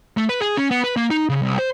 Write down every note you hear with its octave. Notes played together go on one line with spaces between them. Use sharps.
A3
B4
G#4
C#4
B3
B4
A#3
D#4
C#3
C2
C5